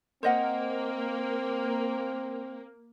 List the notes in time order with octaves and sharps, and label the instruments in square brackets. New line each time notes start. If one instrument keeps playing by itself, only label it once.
[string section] A#3 [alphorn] C4 [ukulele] C5 D#5 F#5